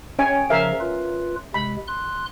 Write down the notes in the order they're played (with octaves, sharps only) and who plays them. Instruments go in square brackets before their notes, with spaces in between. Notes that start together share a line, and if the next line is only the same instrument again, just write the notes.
[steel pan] C#4 C#5 G#5 [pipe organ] G5
[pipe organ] C#3 F3 [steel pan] A#4 E5 F5
[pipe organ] F4 B4
[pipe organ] C3 G#3 [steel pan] B5
[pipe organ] C6 F#6